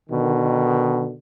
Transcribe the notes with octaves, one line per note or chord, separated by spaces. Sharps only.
B2 D3 D#3